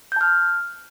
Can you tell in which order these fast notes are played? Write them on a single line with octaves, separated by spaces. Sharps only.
G6 A5 F6